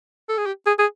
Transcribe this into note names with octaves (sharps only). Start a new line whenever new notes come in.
A4
G#4
G4
G#4
G#4